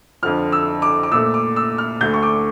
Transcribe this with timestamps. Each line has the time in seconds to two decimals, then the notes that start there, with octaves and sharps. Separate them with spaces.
0.23 F2 D3 F3 F6
0.52 E6
0.82 D6
1.03 D6
1.12 A#2 A3 E6
1.34 D6
1.56 E6
1.78 F6
2.00 D2 D3 A3 G6
2.14 C#6
2.23 D6